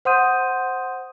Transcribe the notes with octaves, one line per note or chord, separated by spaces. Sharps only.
C5 F#5 C6 D#6 G6 D#7